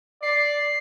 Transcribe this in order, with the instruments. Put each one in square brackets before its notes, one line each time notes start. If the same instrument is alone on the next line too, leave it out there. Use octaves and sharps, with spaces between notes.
[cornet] D5 [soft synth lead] C7